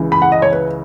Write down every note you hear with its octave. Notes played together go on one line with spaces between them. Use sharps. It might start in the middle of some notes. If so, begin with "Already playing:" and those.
Already playing: C#2 C#3 E3
B5
F#5
D#5
C#5
B4